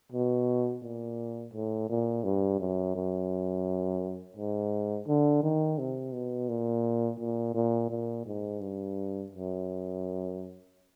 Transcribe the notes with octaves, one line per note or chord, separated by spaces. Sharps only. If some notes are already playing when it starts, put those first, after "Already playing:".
B2
A#2
A2
A#2
G2
F#2
F#2
G#2
D3
D#3
C3
B2
A#2
A#2
A#2
A#2
G#2
G2
F#2